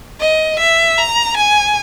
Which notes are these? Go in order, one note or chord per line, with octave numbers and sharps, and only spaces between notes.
D#5
E5
A#5
G#5